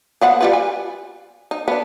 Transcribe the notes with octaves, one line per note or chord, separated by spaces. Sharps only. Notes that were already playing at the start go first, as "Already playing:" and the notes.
F3 B3 F#5
G3 F4 B4
G#5
D#4
B3 D4